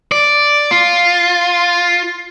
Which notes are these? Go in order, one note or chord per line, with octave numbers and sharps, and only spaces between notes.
D5
F4